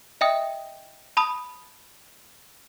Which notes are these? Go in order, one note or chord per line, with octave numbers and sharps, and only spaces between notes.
D#5 E5 G5 D#6
A5 B5 D#6